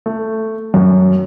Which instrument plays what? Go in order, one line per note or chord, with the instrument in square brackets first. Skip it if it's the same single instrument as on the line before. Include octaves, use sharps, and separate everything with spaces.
[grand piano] A3
F#2